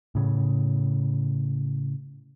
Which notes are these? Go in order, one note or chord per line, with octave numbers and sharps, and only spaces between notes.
A2 C#3